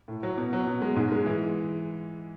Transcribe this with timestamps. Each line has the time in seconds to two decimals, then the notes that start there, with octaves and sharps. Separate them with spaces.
0.08 A2
0.23 F#3
0.38 B2
0.53 F#3
0.67 B2
0.82 G#3
0.96 G#2
1.12 G#3
1.26 E3